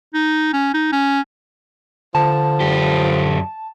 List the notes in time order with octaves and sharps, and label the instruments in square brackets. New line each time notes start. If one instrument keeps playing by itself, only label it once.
[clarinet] D#4
C#4
D#4
C#4
[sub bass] D3 [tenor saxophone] F3 [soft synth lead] A5
[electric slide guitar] F#2 G4